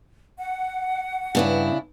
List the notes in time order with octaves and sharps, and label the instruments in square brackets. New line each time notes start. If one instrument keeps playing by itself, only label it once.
[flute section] F#5
[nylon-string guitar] G2 B3 [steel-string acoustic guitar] C#3 D4 E4